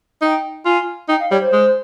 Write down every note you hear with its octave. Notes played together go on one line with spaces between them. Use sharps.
D#4 G5
F4 G#5
D#4 G5
F5
G3 C#5
C5
G#3